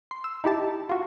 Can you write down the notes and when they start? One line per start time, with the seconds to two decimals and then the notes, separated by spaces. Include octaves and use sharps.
0.11 C6
0.24 E6
0.44 D#4 E4 G4 A5
0.89 F4 F#4